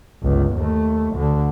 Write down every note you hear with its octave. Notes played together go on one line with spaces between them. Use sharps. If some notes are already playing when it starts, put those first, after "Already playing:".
G1 C#2
D#2 A3
D2 D3